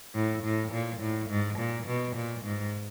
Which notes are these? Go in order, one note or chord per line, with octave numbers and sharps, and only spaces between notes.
A2
A2
A#2
A2
G#2
A#2
B2
A#2
G#2